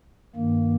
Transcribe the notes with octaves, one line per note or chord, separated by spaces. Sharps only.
G2 D#3 A#3